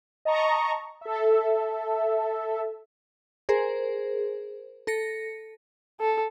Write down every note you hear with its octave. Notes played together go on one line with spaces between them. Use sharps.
D#5 A5 A#5 C#6
A4 E5
G#4 A#4 C5
A4 A#6 C#7
A4